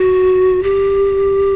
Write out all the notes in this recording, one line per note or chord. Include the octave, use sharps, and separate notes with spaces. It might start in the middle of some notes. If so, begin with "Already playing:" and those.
Already playing: F#4
G4